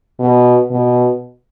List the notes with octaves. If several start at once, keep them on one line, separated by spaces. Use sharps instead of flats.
B2
B2